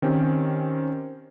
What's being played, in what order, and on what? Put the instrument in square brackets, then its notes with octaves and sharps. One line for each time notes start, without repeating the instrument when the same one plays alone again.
[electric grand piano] D#3 C4 C#4 G4